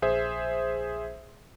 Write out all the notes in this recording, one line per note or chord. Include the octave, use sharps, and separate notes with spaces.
A#1 G#4 C5 E5